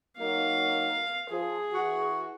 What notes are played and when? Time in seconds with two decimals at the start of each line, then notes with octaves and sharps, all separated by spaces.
0.18 F#3 A#3 D#4 F5
1.30 F3 G#4
1.73 E3 F#4